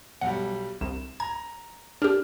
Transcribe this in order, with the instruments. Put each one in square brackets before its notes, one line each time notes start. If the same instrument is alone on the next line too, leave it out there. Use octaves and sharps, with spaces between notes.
[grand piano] B1 G3 [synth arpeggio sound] F#5
[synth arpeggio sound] C2 [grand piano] E7
[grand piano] A#5 [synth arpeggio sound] G#6
[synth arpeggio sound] D4 G4 [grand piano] F6